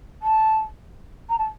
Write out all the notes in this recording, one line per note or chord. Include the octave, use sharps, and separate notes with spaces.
A5
A#5
A5